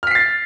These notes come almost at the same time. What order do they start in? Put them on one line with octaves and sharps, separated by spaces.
F6 B6 C7 A6